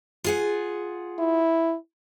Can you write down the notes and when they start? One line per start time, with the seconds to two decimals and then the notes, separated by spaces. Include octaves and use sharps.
0.24 F4 G#4 F#5
1.19 E4